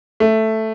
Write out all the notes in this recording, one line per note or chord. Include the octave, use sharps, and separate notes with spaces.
A3